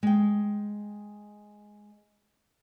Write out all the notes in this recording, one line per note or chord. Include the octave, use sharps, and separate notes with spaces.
G#3 G5